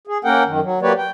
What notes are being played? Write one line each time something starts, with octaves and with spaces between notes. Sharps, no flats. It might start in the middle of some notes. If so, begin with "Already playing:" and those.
G#4
A#3 C#4 A#4 F#5 G5
F#2 D#3
F#3
F#3 A#3 G4 B4 C#5 D5
G5